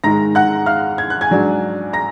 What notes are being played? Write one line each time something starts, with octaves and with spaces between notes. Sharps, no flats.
G#2 D#3 G#3 A#5 A#6
F#5 F#6
F5 F6
G#6
F#6
G#5 G#6
G#2 F#3 D4
A#5 A#6